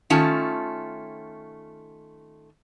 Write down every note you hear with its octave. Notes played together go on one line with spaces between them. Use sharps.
D#3 A3 C#4 F4 A5